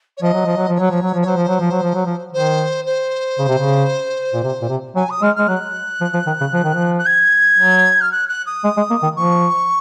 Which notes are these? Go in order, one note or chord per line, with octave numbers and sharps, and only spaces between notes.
C#5
F3 D#5
F#3
F3
F#3
F3
F#3 C#5
F3
F#3
F3
C#5
F#3 C5
F3
F#3
F3
F#3
F3
F#3
F3
D#3 C5
C5
C#3
C3
C#3
A#2
C3
A#2
C3
F#3 G#5
D#6
G#3 F6
G#3 F6
F#3 F#6
F3
F3
D#3
C#3
F3
D#3
F3
F#6
G#6
F#3
F6
F#6
F#6
D#6
G#3
G#3
A#3
D#3
F3 C#6